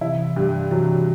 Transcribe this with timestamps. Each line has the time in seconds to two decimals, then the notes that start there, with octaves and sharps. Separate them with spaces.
0.01 C3 E3 E4
0.36 G2
0.71 C3 E3 F#3